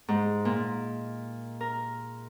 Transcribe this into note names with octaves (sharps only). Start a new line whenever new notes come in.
G#2
A#2
A#4